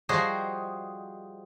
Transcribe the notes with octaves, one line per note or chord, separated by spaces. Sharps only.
F3 G3 F#4 G#4 C5 D#5